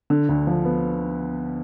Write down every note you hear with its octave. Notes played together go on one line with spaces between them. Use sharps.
D3
D2
F3
B3